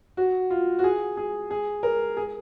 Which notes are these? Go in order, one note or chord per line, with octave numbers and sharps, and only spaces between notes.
F#4
F4
F#4
G#4
G#4
G#4
A#4
G#4